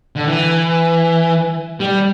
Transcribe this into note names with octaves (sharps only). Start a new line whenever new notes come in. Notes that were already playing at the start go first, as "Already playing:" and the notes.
D3
E3
G3